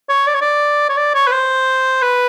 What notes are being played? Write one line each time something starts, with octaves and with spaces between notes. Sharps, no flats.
C#5
D5
C#5
D5
C#5
D5
C#5
B4
C5
B4